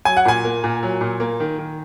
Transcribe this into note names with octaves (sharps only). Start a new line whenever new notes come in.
F#3 G#5
F#5
A#2 G#5
A#3
A#2
F#3
A#2
A#3
D#3
D#3